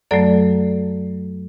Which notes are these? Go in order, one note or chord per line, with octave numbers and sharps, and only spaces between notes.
F#2 F#3 A3 A4 D5